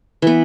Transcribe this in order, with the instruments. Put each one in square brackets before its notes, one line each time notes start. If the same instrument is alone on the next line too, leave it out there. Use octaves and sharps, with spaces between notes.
[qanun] E3 B3